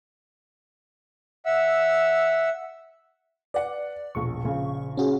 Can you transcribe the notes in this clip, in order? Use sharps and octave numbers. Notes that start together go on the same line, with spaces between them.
E5 F#5 E6
B4 D5 F#5
E1 A#1 C#6
A#1 C#3
C#4 F#4 G#4